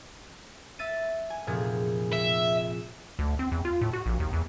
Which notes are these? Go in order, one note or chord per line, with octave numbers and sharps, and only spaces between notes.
E5 A6 D#7
G#5
F1 A#2 G#4
E5
D2
C4
E2
F4
A2
F#4
A#1
D#2
E2